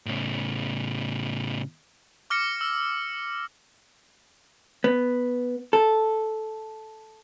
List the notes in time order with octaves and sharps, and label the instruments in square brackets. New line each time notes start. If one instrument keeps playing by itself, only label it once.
[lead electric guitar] A2 C#3
[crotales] D6 F6 A#6 C#7
E6
[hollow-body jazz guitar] B3
A4